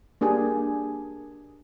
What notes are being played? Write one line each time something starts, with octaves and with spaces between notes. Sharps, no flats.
A#3 D4 G4 G#4